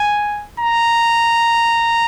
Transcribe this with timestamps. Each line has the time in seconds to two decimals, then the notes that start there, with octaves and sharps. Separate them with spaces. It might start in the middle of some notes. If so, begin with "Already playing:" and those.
Already playing: G#5
0.60 A#5